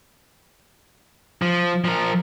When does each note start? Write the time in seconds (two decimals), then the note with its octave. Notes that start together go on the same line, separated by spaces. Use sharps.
1.42 F3
1.85 F3 A#4